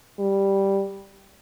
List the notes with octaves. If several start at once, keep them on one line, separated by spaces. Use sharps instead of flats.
G3